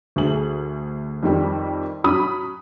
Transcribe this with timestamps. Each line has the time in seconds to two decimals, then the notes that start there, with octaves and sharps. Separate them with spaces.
0.16 D2 A3 G#4 F#7
1.23 F2 D#3 G3
2.04 F#3 C#4 B5 D#6